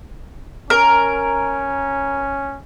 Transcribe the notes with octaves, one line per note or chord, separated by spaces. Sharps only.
C#4 A#4